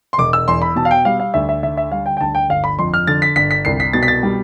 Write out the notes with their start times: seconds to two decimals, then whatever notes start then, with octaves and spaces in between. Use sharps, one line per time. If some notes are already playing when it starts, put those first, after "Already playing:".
0.13 C6
0.18 E1 D6
0.33 E6
0.48 E2 C6
0.62 B5
0.76 B2 A5
0.85 F5
0.91 G5
1.05 G3 F5
1.20 F5
1.34 D2 E5
1.49 E5
1.63 D3 E5
1.77 E5
1.92 G3 F5
2.06 G5
2.17 G5
2.21 D2 A5
2.35 G5
2.49 G1 F5
2.64 B5
2.79 F2 C6
2.94 F6
3.07 D3 A6
3.22 B6
3.36 G1 B6
3.51 B6
3.65 C2 C7
3.80 B6
3.93 B2 A6
4.03 B6
4.08 A6
4.23 G3